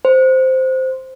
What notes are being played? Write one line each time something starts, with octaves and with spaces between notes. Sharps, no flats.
C5